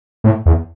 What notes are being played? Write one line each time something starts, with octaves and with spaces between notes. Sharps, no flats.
A2
E2